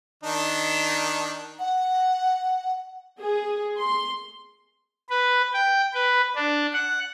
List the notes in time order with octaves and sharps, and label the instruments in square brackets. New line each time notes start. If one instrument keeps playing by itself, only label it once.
[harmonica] D#3 D4 D#4
[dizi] F#5
[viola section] G#4
C6
[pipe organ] B4
G5
B4
D4
F#5